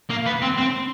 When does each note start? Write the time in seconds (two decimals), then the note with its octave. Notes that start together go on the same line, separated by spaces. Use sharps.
0.10 A#3
0.26 B3
0.42 C4
0.58 C4